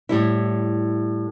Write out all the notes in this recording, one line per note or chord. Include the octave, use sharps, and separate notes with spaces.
A2 G3 E4